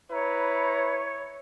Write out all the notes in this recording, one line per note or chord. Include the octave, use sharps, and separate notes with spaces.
E4 B4 C#5 A#5